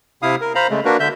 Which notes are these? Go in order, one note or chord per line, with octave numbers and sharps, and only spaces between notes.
C3 E4 F5 D#6
A#4
C5 F5 A#5 B5
C#3 G#3 A3
A#3 D4 F#4 A#4 B4
D3 E5 G6